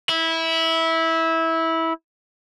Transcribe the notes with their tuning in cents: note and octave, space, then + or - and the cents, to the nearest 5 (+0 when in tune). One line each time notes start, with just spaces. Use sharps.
E4 -15